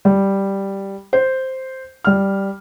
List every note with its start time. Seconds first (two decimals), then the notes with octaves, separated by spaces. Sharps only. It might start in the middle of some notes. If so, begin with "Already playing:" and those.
0.05 G3
1.13 C5
2.05 G3 F6